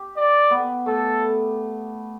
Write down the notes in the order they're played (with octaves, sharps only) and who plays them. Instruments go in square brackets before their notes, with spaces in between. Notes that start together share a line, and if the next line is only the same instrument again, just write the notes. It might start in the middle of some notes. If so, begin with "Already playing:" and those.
Already playing: [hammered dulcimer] G4
[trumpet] D5
[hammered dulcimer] B3
[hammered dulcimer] A3 [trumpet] A4